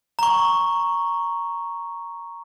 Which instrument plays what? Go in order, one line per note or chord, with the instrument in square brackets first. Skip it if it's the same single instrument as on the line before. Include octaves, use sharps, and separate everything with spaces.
[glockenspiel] A#5 C#6